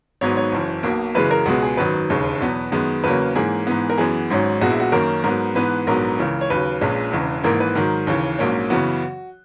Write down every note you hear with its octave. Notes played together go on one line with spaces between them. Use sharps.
G#1 G#2 F#3 B3 C#5
C#5
F#1 F#2 E3
B1 B2 A#3
F#2 C#3 E3 G#3 B4
A#4
C#2 B2 G#3 B3 F#4
G#4
G#1 F#2 D#3 F#3 B4
E1 D#2 C#3 G#3
E2 B2 F#3 B3
F#2 D#3 G#3 B3
E2 C#3 F#3 A#3 C#4 B4
G#2 E3 A#3 C#4 G#4
G#2 E3 B3
A#4
F#2 E3 B3 G#4
G#1 G#2 F#3 C#4
A#1 A#2 G#3 B3 F#4
E4
F#4
F#2 D#3 A#3 C#4 A#4
G#2 F#3 B3 A#4
G#2 E3 B3 B4
A#1 G#2 F#3 B3 A#4
C#2 C#3 E3
C#5
D#2 C#3 F#3 B4
A#1 A#2 G#3 C#4
E1 E2 C#3 E3
G#1 G#2 E3 A#3 A#4
B4
G#2 D#3 F#3 A#4
D#2 C#3 E3
A#1 G#2 F#3 A#3 C#4
F#2 C#3 E3 B3 F#4